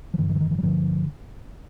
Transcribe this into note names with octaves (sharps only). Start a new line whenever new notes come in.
F3
G2 D3 E3
D#3
E3
D#3
E3
F#3
G2 D3 F3